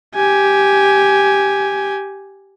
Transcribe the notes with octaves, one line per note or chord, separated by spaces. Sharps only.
G4 G#5